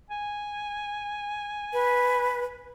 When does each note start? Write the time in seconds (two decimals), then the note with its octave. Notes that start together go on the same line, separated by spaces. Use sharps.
0.10 G#5
1.73 B4